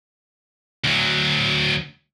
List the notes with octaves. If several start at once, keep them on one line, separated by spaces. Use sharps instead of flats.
D2 F#3